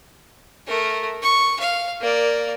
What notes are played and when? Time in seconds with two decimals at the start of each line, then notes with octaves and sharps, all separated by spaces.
0.67 A3 A#4
1.22 C#6
1.60 F5
2.01 A#3 D5